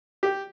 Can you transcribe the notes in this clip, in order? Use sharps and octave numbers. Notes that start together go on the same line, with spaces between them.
G4